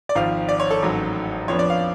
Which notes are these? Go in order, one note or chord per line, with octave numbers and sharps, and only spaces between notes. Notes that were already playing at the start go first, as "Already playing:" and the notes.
D5
G#1 G#2 F3 F5
D5
C#5
A4
A1 G#2 F#3
F2 F3 B3 D4 C#5
D5
F5